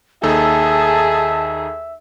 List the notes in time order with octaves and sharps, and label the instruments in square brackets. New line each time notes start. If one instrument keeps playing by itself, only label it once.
[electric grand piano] D#2 D#4 A4 [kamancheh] G#4 [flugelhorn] E5 [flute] A5